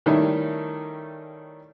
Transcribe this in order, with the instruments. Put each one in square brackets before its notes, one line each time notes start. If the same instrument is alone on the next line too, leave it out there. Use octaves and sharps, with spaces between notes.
[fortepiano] D#3 G3 A3 C#4 D#4 E4